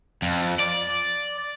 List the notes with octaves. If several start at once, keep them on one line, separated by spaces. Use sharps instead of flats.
F2
D5